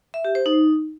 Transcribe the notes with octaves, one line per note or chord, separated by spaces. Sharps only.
E5
G4
C5
D#4